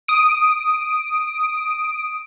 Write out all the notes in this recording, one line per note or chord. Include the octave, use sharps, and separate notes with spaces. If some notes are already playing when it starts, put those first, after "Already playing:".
D#6 D7